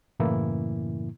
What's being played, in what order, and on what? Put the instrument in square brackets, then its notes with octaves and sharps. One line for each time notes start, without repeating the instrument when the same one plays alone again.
[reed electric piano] F#2 A2 C#3 E3 A#3 E4